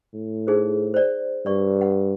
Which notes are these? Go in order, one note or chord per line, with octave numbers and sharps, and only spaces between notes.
A2
D#4 G#4 C5
C5 D5
G2 D5 C#6
F#5